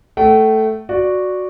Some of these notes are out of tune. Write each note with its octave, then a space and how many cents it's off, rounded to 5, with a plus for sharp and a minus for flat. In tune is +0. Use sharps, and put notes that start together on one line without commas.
A3 +0 G5 -45
F#4 -5 D5 +0